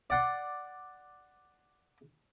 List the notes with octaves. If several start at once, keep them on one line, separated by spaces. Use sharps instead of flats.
D5 F#5 C6